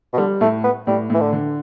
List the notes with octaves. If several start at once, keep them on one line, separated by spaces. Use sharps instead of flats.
B2
D3 G3
A2 A3
B3
A2 G3
A2 E3
D3
D3